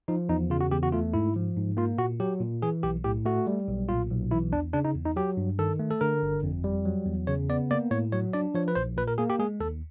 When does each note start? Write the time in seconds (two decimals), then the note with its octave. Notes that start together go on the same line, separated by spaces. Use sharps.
0.08 F3 D#4
0.29 E2 D#4
0.50 C#3 F4
0.61 F#4
0.71 E2 G4
0.83 F#4
0.92 A3 F4
1.14 G#2 E4
1.36 F3
1.57 G#2
1.77 A#3 F4
1.98 A#2 F#4
2.20 F#3 G4
2.40 A#2
2.62 E3 G#4
2.83 B1 G4
3.04 A2 G4
3.26 A3 F#4
3.47 G3
3.68 B1
3.89 A#2 F4
4.10 B1
4.31 E3 E4
4.53 E2 D4
4.73 C#3 D4
4.85 D#4
4.95 E2
5.05 D#4
5.16 F#3 G4
5.37 G2
5.59 D#3 A4
5.80 A3
5.91 A4
6.01 D3 A#4
6.23 G1
6.43 F2
6.64 G3
6.85 F#3
7.06 E2
7.27 C#3 C#5
7.49 B3 D5
7.71 A#3 D5
7.91 A2 C#5
8.12 F#3 C#5
8.33 D4 D5
8.54 F3 C#5
8.68 B4
8.75 A#1 C5
8.97 A#2 B4
9.08 A#4
9.18 A#3 G#4
9.30 G4
9.39 G#3 G#4
9.60 D#2 A4